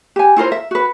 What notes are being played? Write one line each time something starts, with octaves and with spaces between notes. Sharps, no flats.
G4 G#5
E4 F4 A#4 C5
E5
F#4 B4